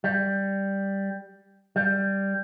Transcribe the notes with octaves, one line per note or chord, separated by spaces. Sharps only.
G3
G3